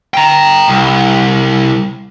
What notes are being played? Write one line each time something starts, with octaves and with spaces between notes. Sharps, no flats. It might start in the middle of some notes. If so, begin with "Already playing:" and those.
G5 A#5
C2